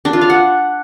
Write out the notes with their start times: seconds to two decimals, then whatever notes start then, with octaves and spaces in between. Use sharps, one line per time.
0.05 D4
0.13 F4
0.21 F5
0.30 F#5